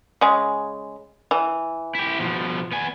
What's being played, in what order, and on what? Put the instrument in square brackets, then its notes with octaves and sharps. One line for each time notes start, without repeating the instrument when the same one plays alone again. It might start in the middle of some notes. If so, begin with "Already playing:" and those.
[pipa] C#3 G#3
E3
[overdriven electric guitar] E4 G4
B2 F3
B3 G#5